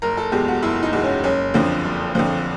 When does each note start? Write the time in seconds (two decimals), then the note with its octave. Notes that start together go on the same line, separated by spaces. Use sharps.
0.02 F#1 A#4
0.17 A4
0.32 E2 B2 G#3 G4
0.48 F#4
0.62 F#1 E4
0.83 D#4
0.93 E2 B2 G#3
1.03 C#4
1.23 F#1 C#4
1.54 F2 D3 F3
1.84 F#1
2.15 F2 D3 F3